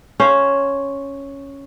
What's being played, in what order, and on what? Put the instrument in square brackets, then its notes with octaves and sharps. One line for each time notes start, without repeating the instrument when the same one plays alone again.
[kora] C#4 C5 F5